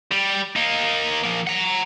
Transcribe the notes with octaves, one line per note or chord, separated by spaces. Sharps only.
G3
A#3 D#4
F3 A#3
F#5 A#5